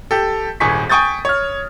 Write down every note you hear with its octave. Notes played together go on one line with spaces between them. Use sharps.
G4 A4
D#1 G#1 G#4 C#6 B6
G5 G#5 C#6 D#6 G6 A6
C#5 F6